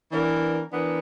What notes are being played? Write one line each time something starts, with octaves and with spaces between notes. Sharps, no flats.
E3 B3 D4 A#4
E3 B3 D4 A#4